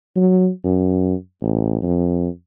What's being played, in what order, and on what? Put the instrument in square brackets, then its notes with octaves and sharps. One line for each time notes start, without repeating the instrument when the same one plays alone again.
[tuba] F#3
F#2
A1
F2